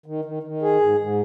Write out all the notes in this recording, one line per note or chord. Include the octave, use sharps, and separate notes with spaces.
D#3
D#3
D#3
G#4
G#2
G#2